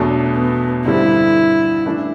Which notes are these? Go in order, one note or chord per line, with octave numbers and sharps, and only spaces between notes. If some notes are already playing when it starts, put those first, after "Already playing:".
Already playing: E2 B2 F#3 A3 D4
B3
G2 D3 G3 C4 E4
E3 A3 D4